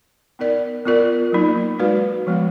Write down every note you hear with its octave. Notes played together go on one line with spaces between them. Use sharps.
B3 D#4 A#4 D5
B3 F4 A#4 D5
F#3 A#3 D#4
G#3 D#4 F#4 B4 D5
F3 G#3 B3